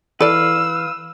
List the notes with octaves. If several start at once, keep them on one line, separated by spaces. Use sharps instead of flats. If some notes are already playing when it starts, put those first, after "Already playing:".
E3 A4 B4 D5 F5 E6